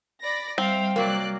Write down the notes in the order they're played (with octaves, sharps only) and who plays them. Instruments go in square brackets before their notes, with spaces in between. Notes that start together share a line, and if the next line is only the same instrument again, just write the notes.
[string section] D5 B5 A#6
[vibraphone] G3 [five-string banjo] C4 [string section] E5 F5 G5
[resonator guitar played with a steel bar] C3 F#3 A#3 [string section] D5 F#6